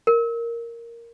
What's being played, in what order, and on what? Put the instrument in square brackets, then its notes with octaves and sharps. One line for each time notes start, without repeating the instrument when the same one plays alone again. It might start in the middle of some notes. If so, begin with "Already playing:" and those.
[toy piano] A#4